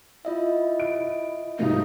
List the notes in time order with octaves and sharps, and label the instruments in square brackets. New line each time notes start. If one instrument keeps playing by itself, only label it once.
[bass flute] E4 [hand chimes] F4 D#5 E5
[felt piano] D7
[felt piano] B1 G#2 A#3 [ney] D#4